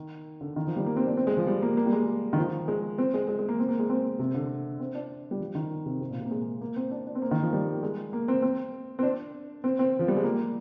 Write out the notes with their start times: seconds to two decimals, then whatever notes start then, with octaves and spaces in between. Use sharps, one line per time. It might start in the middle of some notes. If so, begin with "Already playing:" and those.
Already playing: D#3
0.41 D3
0.56 D#3
0.67 F3
0.76 G3
0.86 A#3
0.96 C4
1.07 D4
1.17 C4
1.27 G#3
1.37 F3
1.47 G3
1.62 A#3
1.77 A#3
1.86 G3
1.92 G#3
2.33 D#3
2.38 F3
2.68 G#3
2.98 C4
3.14 G#3
3.28 G#3
3.39 G#3
3.48 A#3
3.59 C4
3.69 A#3
3.79 G#3
3.90 C4
4.19 C3
4.35 D3
4.80 C4
4.95 D4
5.31 G3
5.40 F3
5.55 D#3
5.86 C3
6.01 C3
6.11 A#2
6.21 C3
6.26 A#3
6.31 G#3
6.61 A#3
6.76 C4
6.91 D4
7.07 D4
7.15 C4
7.22 A#3
7.31 D#3
7.42 F3
7.53 G3
7.83 G#3
8.13 A#3
8.28 C4
8.42 C4
8.99 C4
9.03 D4
9.64 C4
9.79 C4
9.99 F3
10.08 G3
10.17 G#3
10.24 A#3